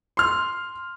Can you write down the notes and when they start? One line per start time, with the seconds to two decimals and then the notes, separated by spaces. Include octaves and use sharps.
0.17 C6 F6